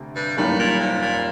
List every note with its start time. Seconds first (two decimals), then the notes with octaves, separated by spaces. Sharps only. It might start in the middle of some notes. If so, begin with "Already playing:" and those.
Already playing: D2 C3
0.15 G2
0.37 F#1 F#2 A2 D#3 G3 A#3
0.59 A#2
0.80 C3
1.02 A#2